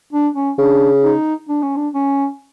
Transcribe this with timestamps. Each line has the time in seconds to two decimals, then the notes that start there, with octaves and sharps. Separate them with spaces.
0.13 D4
0.35 C#4
0.58 C#3 D4
1.03 D#4
1.49 D4
1.62 C#4
1.76 D4
1.94 C#4